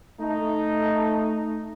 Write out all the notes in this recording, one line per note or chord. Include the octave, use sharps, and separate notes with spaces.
A3 D#4